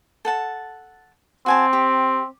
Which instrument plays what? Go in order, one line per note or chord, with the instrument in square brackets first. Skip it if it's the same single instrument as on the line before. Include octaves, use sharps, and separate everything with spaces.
[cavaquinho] A4 F#5 A5
[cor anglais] C4 [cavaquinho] F#4 G#5 A5
[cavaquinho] G4